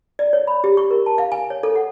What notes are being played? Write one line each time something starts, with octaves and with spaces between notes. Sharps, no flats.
D5
C#5
B5
G4
C#6
A#4
A5
F5
G#5
C#5
A4
F#5